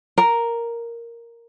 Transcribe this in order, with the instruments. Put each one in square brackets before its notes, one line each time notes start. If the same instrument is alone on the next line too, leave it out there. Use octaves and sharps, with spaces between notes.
[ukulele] A#4